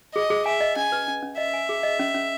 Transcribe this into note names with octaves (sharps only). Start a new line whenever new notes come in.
G#4 D#5
G#4
E5 G#5
D#5
C#4 G#5
B4
C#4
C#4
D#5 E5
G#5
G#4
D#5
C#4
C#4